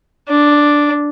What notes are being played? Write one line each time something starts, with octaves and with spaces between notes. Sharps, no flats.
D4